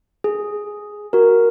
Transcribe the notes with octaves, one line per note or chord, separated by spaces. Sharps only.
G#4
F#4 A#4